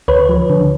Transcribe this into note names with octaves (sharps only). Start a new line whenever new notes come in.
D2 B4 C#5
F3
D3